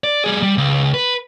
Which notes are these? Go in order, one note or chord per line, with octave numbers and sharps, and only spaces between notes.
D5
G3 G#4
G3
C#2
B4